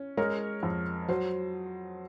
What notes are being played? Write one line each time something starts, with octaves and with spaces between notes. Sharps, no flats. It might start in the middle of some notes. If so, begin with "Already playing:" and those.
Already playing: C#4
G#3 A#4 C#5
F2
F#3 C5